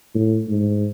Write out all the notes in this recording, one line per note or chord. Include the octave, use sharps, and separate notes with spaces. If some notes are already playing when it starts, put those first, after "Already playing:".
A2
G#2